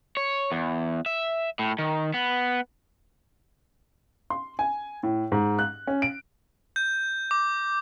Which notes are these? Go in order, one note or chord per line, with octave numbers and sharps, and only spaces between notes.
C#5
E2
E5
A2
D#3
B3
C6
G#5
A2
G#2
F#6
C#4
D7
G6
D6